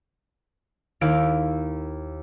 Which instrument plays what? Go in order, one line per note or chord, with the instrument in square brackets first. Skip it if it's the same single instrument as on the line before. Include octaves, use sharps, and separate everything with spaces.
[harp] D#2 E4 F5 D7